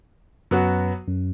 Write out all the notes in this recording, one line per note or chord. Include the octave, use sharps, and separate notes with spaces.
F#2 F#3 B3 F#4
F#2